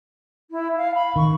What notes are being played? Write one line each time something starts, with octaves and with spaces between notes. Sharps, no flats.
E4
F5
B5
D#3 C#6